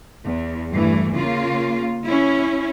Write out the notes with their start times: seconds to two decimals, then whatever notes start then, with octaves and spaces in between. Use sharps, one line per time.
0.24 E2
0.72 G2 E3 A3
1.15 C#3 A#3 F4
2.06 C#4 E4